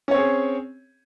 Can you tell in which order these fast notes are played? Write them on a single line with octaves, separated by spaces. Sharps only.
C#4 C#5 C4 G#4